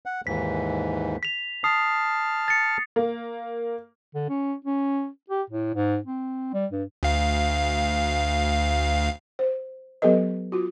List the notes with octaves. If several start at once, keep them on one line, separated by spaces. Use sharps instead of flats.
F#5
D#2 G#2 E3 B6
B6 F7
A5 D#6 F6 C7
A6 C#7
A#3
D3
C#4
C#4
G4
A2
G#2
C4
G3
G2
D2 F5
C5
F#3 B3 G4 A4 B4 D#5
F4 F#4